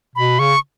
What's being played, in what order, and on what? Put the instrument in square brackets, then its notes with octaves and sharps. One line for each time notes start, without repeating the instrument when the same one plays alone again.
[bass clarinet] B2 [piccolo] B5
[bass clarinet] C#3 [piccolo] C#6